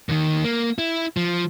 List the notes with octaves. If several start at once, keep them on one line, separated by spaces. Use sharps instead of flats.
D#2 D#3
A#3
E4
F3